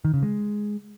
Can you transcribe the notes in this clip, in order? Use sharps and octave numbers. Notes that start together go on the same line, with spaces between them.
D#3
C#3
G#3